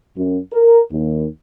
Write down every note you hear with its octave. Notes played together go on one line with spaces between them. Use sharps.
F#2
A#4
D#2